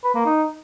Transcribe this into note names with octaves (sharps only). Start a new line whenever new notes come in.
B4
A#3
D#4